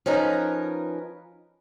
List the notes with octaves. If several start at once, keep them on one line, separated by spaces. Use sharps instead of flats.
F3 C#4 D#4 A#4 B4